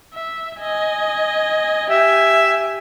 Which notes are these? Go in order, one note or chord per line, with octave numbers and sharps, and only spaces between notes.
E5
D#5 G#5
G4 E5 G#5